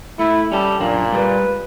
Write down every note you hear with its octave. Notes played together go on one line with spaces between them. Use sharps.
A3 E4
G3 C#4 A4
F#2 A#2 A#3 D4
G3 G#3 B4